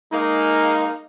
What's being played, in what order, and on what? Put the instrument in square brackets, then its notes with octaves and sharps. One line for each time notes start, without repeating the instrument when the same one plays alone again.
[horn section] G#3 A#3 [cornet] D#4